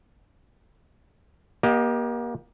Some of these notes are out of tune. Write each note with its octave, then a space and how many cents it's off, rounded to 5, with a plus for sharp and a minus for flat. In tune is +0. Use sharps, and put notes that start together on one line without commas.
A#3 +30 G4 +0 D#5 +0